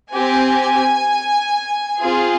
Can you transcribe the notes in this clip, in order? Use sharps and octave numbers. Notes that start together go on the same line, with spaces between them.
C4 G4 G#5
C4 F4 G#4